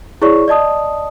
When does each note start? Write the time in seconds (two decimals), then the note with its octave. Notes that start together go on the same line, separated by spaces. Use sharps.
0.22 E4 G#4 C#5 D5 C#6
0.48 D5 D#5 A5 D#6